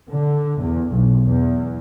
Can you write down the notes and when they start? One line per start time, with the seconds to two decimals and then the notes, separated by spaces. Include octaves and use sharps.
0.11 D3
0.60 E2
0.89 B1
1.24 E2